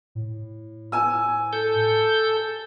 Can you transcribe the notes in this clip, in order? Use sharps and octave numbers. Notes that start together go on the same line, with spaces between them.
A2
G#5 E6
A4 G6